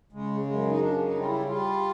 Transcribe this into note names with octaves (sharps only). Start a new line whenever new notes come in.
C#3 G#3
F#2 G#3
D#4
C#3 D4
D#4
G3
F4
E4
G3 F4